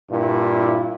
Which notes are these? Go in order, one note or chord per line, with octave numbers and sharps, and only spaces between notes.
G2 A#2 E4